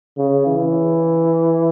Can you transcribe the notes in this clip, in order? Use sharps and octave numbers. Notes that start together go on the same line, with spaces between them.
C#3
E3